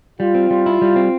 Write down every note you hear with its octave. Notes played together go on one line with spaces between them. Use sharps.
G3 F4
C4
G3
E4
G3
C4